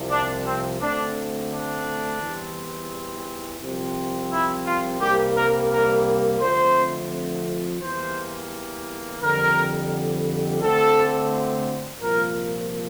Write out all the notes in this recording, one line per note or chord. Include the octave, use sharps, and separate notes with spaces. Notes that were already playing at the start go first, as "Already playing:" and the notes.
Already playing: C2 C3 F3
D4
C4
D2 D3 A3 C4 D4
D4
E2 E3 G3 C4
C2 C3 F3 C4
E4
F4
C2 C3 G3 A#3 G4
A#4
A#4
F2 D3 F3 A3 C4 C5
E2 E3 G3 A#3 C5
F2 D3 G3 A#4
D2 D3 A3 C4 A4
C2 A#2 F3 A#3 A#4